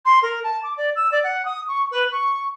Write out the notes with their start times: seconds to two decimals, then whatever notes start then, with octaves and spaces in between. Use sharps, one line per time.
0.05 C6
0.22 A#4
0.44 A5
0.63 D6
0.77 D5
0.96 E6
1.11 D5
1.24 F#5
1.45 D#6
1.68 C#6
1.91 B4
2.12 C#6